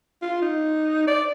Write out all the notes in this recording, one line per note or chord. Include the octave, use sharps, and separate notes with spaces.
F4
D#4
D5